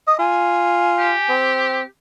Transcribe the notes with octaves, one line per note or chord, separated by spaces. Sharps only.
D#5 D#6
F4 G#5
G4
C4